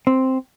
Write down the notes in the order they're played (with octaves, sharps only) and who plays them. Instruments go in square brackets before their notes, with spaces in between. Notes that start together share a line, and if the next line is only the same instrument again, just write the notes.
[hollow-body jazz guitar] C4